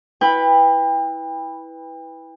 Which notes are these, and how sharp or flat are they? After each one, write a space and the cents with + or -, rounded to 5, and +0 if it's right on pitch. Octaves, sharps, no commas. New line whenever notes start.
E4 -10 B4 +0 G5 +35